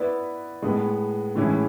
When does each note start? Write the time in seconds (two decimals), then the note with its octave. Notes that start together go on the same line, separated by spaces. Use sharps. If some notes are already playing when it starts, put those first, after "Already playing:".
Already playing: B3 E4 B4 D5
0.62 A2 G#3 B3
1.36 A2 E3 G#3 C#4 E4